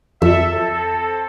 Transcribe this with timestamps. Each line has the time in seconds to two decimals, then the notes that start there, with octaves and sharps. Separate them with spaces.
0.22 F2 A4 E5
0.52 C4 A4